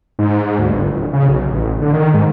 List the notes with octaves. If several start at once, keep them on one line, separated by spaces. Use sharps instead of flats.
G#2
D2
G1
D1
C#3
B1
A1
D3
D#3
G#2